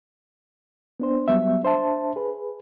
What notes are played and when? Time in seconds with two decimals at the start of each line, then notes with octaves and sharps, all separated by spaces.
1.00 B3 D4 C5
1.28 F#3 G3 B3 E5
1.63 D4 C5 E5 A5
2.16 G#4 B4